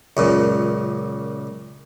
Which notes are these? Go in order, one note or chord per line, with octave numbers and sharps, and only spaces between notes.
C#2 F#2 A#2